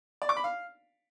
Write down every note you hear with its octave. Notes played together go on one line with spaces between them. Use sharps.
D5
D6
B5
F5